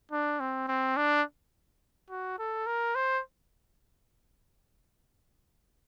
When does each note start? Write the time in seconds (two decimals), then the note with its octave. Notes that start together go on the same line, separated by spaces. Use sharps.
0.11 D4
0.40 C4
0.68 C4
0.97 D4
2.10 F#4
2.39 A4
2.66 A#4
2.95 C5